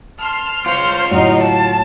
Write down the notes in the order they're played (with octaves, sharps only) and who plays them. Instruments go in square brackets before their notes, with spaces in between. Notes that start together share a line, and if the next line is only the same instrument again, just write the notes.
[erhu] A5 [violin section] C6 F6
[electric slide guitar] F4 C#5 [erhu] C5
[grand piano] A2 F#3 [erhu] D#4
[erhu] A5